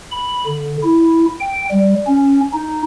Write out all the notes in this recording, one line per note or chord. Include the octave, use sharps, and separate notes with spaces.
B5
D3
E4
G5
G3
C#4
D#4